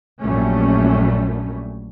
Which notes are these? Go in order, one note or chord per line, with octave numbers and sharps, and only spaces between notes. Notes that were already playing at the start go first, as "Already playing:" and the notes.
A#1 F#2 G3 A3 C#4